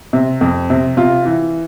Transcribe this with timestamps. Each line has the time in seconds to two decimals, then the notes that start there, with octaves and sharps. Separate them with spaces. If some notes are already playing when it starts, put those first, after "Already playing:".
0.13 C3
0.41 F2
0.70 C3
0.97 C3 F4
1.25 E3